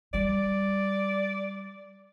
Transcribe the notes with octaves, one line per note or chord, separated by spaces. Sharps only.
G3 D5